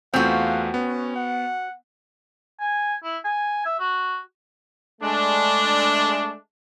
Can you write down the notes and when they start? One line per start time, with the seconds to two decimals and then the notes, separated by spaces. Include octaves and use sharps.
0.14 E2 A3 C4 F4 F#4 F5
0.74 B3 C#4
1.16 F#5
2.60 G#5
3.04 E4
3.24 G#5
3.65 E5
3.79 F#4
5.01 G#3 A3 D4